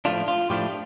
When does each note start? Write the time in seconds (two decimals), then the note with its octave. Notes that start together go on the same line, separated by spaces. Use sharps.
0.05 A2 F3 A3 D4 F4
0.28 F4
0.50 A2 F3 A3 D4 G4